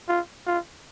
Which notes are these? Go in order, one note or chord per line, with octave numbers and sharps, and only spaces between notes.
F4
F4